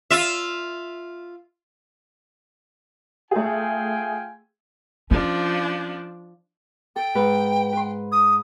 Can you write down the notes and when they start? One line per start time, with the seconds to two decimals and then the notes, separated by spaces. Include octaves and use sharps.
0.11 F4 E5
3.31 A3 F4 G#4 G5 G#5
5.11 F3 C#4 D4
6.96 A4 G5
7.15 G#2 B4
7.73 B4 C6
8.12 D#6